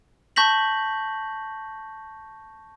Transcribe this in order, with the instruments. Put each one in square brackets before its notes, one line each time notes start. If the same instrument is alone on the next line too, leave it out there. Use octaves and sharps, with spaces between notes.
[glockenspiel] A5 C#6 G6 A#6 B6 F#7